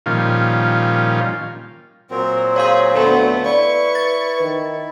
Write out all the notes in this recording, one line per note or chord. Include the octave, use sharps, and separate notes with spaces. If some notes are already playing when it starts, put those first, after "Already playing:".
A#2 D#3 F3 G3 C#4 F4
A#2 F#3 C4 A#4
G#4 C#5 F5 C6
D2 A3 B3
E4 B4 D5 C#6
A6
D#3